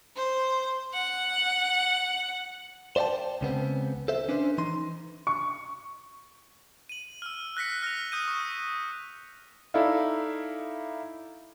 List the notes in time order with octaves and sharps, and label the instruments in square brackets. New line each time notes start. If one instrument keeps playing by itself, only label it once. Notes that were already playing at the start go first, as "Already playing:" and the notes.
[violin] C5
F#5
[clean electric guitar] C5 D5 E5 G5 A5
C#2 C#3 B3 C4
A4 C5 E5
C#4 D4 B4 C5
E3 D#4 C6
[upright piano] C#6
[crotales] D#7 F#7
E6 F6
F#6 A#6 B6 C#7
F6 A#6 B6 F7
D#6 G6 D#7
C#6 D#6
[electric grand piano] D#4 E4 A4 D5 E5 F5